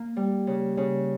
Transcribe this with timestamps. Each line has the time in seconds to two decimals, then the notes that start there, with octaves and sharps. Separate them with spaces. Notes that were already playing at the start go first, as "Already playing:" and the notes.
Already playing: A#3
0.17 G3
0.47 C#3
0.77 C#3